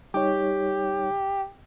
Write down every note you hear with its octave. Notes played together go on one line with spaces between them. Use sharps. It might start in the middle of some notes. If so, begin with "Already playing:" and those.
G3 D#4 G4 C#5